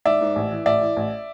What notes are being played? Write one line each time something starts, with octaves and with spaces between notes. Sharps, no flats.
G#2 D5 E5
G#2
A1
E3
A1 D5 E5
E3
A1